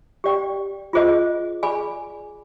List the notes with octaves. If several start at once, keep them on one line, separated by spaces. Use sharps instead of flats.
G4 D5 G5
F4 G#4 C5 D#5
G#4 D5 G#5 B5